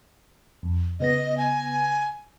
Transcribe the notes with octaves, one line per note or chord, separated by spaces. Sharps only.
F2
C#3 B3 D#5 A#6
G#5